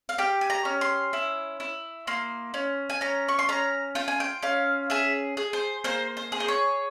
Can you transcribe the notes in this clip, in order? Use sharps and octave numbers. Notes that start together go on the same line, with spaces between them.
F5
G4 G5
G#5
A#5
C#4
C6
E4
E4
A#3 C6
C#4
G#5
C#4 A#5
C#6
C6
C#4 A#5
F4 G5
G#5
G5
C#4 F5
G#4 E5
G#4
C5
A#3 C5
C5
G#4
C5
C#5